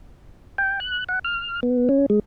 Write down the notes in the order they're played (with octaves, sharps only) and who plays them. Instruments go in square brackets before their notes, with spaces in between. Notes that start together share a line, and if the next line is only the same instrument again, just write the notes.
[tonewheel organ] G5
F#6
F#5
F6
B3
C#4
G#3